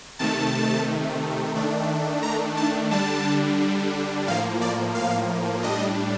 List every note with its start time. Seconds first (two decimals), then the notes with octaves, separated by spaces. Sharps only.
0.19 C3 D#3 A3 A5
1.55 D#3 A3 D4
2.23 A#5
2.57 A5
2.91 D3 G3 D4 A5
4.27 A2 F3 A#3 F5
4.61 D5
4.95 F5
5.63 A2 G3 D4 D#5